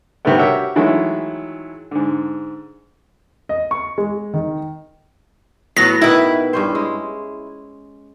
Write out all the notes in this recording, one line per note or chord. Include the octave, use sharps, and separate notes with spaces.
C3 D#3 G3 A3 B3
F#4 G4 A#4 C#5 E5
D#3 E3 F#3 G#3 A3 E4
G#2 D3
D#5
C#6
G#3
D#3
A2 F#3 B3 A#6
B2 D#3 E4 B4
G2 C#4 C5
G#3